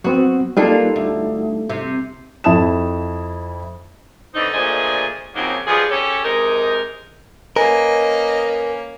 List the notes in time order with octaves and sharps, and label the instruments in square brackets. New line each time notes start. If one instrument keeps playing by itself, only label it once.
[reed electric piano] F#3 B3 C4 [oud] F#4
[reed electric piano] G3 D#4 A4 [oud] A#3 D4 F4
[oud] D2
C3
[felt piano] F2 E4 A5 D#6 E7
[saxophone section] D3 E3 C4 D#4
A#2 D3 A3 G#4 C5 D#5
C#3 F3 F#3 A#3 C4 D#4
F3 G3 G#3 B3 G#4
C#4 G4 A4 C#5
C3 G#3 D#4 A#4
[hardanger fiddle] A#3 C#4 [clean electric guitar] A#4 [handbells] B4 G#5 [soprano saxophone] D#5